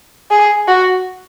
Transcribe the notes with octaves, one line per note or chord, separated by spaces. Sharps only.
G#4
F#4